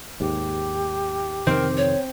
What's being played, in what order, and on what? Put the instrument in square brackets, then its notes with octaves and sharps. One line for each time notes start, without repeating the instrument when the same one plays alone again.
[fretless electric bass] D#2 G#2 [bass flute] G4
[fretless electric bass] F2 C3 D#3 [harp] C4 [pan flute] A#4
[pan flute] C#5